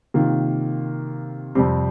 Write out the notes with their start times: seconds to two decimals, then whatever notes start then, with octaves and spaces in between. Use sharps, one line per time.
0.14 C3 D#3 A#3 F4
1.55 F2 C3 G3 C4 G4